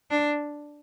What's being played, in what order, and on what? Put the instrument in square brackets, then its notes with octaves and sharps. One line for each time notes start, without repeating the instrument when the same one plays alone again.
[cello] D4